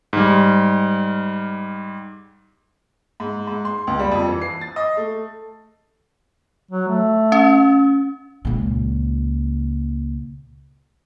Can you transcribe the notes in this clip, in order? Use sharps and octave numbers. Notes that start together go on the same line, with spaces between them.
G#2 G3
G#2
G#2
C6
C#2
G3
F2
E3
C7
A6
D#5
A3
F#3
A3
C#4
C#2 A#2